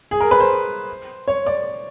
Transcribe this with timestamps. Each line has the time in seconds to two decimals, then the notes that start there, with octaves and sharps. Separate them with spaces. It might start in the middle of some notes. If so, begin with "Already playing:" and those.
0.11 G#4
0.21 A#4
0.31 B4
0.41 C5
1.28 C#5
1.46 D5